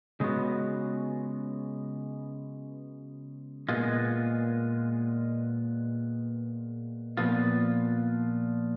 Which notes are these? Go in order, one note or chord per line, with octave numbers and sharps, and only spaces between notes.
C#3 G#3 B3 F#4
A#2 G#3 B3 F4
A#2 F3 B3 F4